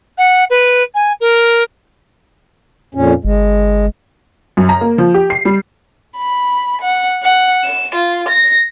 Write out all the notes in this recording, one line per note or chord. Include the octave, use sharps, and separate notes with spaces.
F#5
B4
G#5
A#4
F2 A#2 C#4
G1 G#3
F#2
A#5
A#3
F3
G4
C7
G3
B5
F#5
F#5
E7
F4
A#6